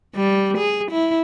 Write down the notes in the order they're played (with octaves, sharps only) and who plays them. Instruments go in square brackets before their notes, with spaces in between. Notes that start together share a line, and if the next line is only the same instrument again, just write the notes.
[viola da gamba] G3
G#4
E4